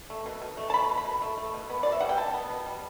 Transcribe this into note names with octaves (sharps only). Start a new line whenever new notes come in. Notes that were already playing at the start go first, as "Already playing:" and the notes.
A3
B2
B2
A3
A5
A3 B5
B2
B5
B2
A3
A3
B2
B3
B2 D5
E5
G3 F#5
G5
B2 A5
B3
B2
G3